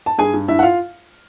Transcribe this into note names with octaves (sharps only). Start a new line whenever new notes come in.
A5
G2 G#4 G#5
G2
G2 E4 E5
F#5
F4 F5